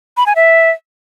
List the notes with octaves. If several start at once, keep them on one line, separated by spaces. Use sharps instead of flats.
B5
G#5
E5